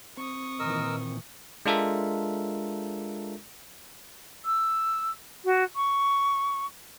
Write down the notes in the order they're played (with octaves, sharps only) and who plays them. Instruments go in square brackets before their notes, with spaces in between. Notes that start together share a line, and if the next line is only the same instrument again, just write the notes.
[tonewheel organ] C4 [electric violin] C#6 D#6
[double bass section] A#2 D#3 E3 [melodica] A#4 D#5 E6
[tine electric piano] G#3 D4 F4 A4 A#4 E5
[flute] E6
F#4
C#6